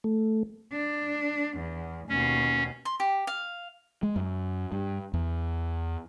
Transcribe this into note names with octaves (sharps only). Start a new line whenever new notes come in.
A3
D4
E2
D#2 B2 C#4
C6
G4
F5
G#3
F#2
G2
E2